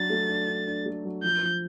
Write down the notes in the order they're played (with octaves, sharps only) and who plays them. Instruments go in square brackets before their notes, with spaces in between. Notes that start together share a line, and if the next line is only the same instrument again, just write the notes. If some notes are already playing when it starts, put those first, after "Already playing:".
Already playing: [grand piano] F#3 D4 [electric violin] A6
[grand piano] A3
D4
D4
D4
A3
F#3
[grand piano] F3 [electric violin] G6
[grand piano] F3